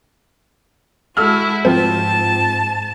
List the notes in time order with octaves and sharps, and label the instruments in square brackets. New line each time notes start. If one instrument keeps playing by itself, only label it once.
[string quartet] G#3 E4 F#4 [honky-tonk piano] A4 E6 F6
[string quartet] G#2 A5 [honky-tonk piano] F3 C4